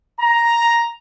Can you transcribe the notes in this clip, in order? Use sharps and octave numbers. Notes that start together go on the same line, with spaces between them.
A#5